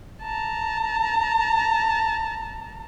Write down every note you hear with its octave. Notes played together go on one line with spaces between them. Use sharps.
A5 A#5